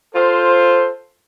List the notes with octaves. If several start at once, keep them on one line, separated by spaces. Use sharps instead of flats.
F4 A4 C5